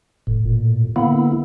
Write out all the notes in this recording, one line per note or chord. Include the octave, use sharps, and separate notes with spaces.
F1 A2
A#2
D3 A#3 B3 E4